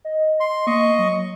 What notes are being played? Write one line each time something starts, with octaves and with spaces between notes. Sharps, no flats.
D#5
C6
A#3 D#5 C#6
F#3